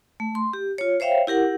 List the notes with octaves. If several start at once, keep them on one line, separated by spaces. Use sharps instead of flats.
A3
C6
G4
F4 C#5
C5 C#5 E5 F5 G5
E4 G4 A#4 F#5